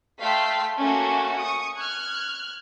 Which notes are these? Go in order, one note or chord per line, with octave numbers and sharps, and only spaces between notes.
A3 F5 G5 C6 B6
A3 A#3 C#4 F#4
C#6 D#6
F6 F#6 G#6